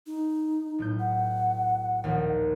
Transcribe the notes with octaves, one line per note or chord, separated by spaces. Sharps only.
D#4
B1 A2 G6
F#5
A#1 D#2